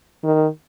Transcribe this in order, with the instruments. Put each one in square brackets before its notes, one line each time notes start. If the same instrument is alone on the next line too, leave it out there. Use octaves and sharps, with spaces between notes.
[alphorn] D#3